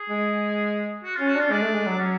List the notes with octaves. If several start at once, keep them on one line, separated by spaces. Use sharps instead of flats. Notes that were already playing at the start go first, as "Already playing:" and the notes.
Already playing: G#4
G#3
F#4
C#4 F4
F#4
D4 F4
G#3 D4
A3
G#3
F#3
F#3 C#4